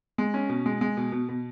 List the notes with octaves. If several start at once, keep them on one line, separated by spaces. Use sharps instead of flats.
G#3
C#4
B2
G#3
G#3
B2
B2
B2